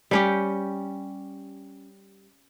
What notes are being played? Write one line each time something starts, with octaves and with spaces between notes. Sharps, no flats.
G3 C#4 G4